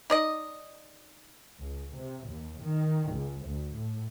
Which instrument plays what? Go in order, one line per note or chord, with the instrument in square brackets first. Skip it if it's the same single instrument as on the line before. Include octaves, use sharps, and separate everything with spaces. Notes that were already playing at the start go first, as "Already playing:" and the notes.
[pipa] D#4 D5 D#5
[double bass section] C#2
C3
D#2
D#3
C#2
D2
A2